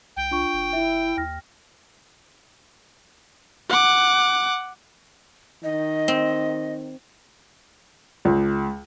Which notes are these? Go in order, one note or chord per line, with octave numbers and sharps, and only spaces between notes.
C2 G5
D4 F4 C#6
F#1
E4 E5
D#2 G5 F6 A#6
F#5 D6
D#3 D#5
C4
C#2